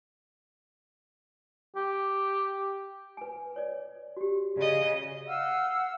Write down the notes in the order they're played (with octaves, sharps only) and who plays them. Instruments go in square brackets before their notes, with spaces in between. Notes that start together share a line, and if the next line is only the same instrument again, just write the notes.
[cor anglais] G4
[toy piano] B4 G#5
C#5 D5
F#4 G4
[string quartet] C#3 D#5 [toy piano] D5
[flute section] F5 F#5 E6 F6